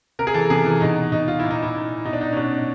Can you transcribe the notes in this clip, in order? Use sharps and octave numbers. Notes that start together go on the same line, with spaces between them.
C3 A#4
G#4
E3 A4
C3 G#4
E3
B2 D#4
B2 D#4
F4
A#2 E4
D#4
E4
A#2
B2 D#4
D4
D#4
C#4
B2 D4